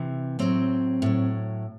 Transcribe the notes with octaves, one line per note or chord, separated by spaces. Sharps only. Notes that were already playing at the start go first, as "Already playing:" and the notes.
Already playing: C3 E3
A2 F#3 C4
A2 F#3